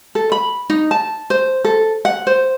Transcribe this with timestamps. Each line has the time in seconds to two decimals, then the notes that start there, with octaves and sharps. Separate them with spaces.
0.15 A4
0.32 B5
0.70 D#4
0.91 A5
1.30 C5
1.64 A4
2.05 F#5
2.27 C5